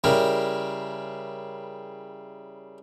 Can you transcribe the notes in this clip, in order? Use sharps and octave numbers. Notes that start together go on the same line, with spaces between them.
C#3 G3 E4 A#4